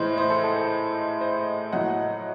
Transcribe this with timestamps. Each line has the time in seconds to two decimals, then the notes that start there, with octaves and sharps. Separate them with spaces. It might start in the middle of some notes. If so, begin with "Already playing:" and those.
Already playing: A2 E3 G#3 C5 D#5 C6
0.18 C5 D#5
0.30 A4
0.44 A4
0.56 C5
1.21 C5 D#5
1.73 A2 F#3 A3 D#5 F#5